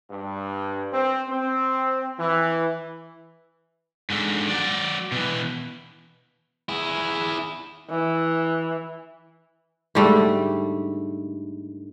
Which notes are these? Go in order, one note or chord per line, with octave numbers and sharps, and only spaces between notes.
G2
C4
C4
E3
G#2 D3
F#3 D5
B2 E3
E4 G#4
E3
G#2 D3 G3 A3